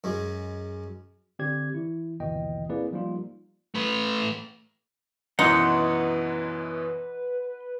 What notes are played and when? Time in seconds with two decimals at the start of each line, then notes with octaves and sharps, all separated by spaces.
0.04 F#2 G#3
1.39 D3 C4 G4 D5 G#6
1.74 E3 E4
2.20 G1 D#2 B2 E3 D#5 G5
2.69 A#3 C4 E4 G#4 B4 D5
2.92 F3 G3 A#3 D#4 F4
3.75 A3 B4
5.39 F#2 B2 E3 D#4 B4 F#5 C6